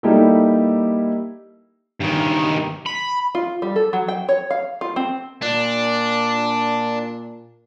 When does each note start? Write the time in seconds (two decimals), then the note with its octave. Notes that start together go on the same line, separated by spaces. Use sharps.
0.03 G3 A#3 D#4 E4 G4 A4
2.00 G2 D#3
2.86 B5
3.35 F4
3.62 G3
3.76 A4
3.93 F#3
4.08 G5
4.29 C#5
4.51 F5
4.81 F4
4.96 C4
5.42 A#2 D4